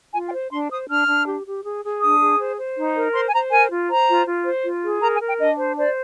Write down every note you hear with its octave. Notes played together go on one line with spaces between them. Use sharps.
F4 G#5
G5
C5
D4 C6
C5 D#6
D4 F6
D4
G4
G4
G#4
G#4
D4 D#6
G#4
C5
C5
D#4
A#4
C5 C6
G#5
C5 A#5
A#4 G#5
F4
C5 A#5
F4
F4
C5
F4
G#4
A#4 A#5
G#5
A#4
G5
D4 D#5
C5
C5 D5